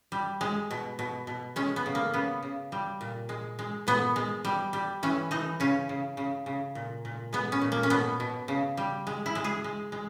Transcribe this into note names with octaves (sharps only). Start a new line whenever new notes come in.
G3
G#3
B2
B2
B2
G#3 C#4
B3
C#3
A#3
C#3 B3
C#3
G3
A#2
G#3
G#3
A#2 B3
G#3
G3
G3
E3 C#4
E3 D#4
C#3 C#4
C#3
C#3
C#3
A#2
A#2
G#3 B3
C#4
A#2
A#3
C#4
B2 B3
B2
C#3
G3
G#3
E4
G#3
G#4
G#3
G#3